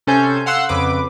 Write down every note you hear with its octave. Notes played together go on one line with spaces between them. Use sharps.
C3 C#4 A4 C5 G#5 G6
F5 F#5 C6 E6 F#6
F2 C#3 B4 D6